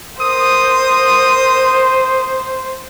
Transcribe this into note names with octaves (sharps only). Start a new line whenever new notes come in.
A#4 C5 D#6